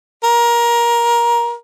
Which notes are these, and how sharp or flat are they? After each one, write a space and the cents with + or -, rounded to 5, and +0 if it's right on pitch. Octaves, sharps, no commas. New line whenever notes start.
A#4 +20